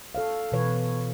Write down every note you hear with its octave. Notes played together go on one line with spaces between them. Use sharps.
A4 C#5 F5
B2 E3 B4 C#5